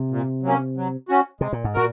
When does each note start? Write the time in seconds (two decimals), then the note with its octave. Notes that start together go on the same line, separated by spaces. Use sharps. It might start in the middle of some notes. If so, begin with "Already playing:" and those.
Already playing: C3
0.11 A#2
0.43 F#3 A#3 C#4
0.76 F#3
1.09 C#4 F#4
1.40 C3 G#3
1.53 A#2
1.64 G#2
1.74 A#2 F#4 A#4